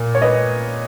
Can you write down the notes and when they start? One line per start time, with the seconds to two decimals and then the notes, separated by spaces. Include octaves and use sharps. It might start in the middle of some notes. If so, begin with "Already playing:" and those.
Already playing: A#2
0.15 C#5
0.22 B4 D#5